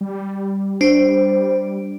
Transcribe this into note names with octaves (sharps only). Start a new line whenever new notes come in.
G3
D4 C5